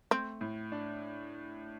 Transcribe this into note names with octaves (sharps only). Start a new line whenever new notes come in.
A3 C4
A2
D4